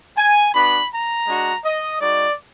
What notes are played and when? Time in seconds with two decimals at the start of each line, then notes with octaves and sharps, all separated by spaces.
0.17 G#5
0.54 B3 D4 F#4 B5
0.92 A#5
1.28 G#3 D4 F#4
1.65 D#5
2.01 G#3 D#4 F#4 D5